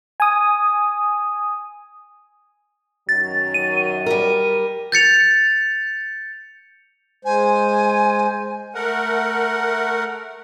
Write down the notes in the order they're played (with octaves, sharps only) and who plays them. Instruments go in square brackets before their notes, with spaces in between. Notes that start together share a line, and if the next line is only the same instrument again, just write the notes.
[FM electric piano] G#5 D#6
[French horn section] F#2 D#3 F#3 [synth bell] A6
[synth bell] D#7
[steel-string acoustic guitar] G3 A#4
[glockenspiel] G6 A6 C#7 F7
[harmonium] G#3 C5 [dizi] G#5
[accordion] A3 A#4 F#5